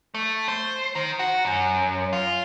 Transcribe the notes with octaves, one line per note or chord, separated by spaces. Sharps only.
A3
C5
D#3
F#4
F#2
F4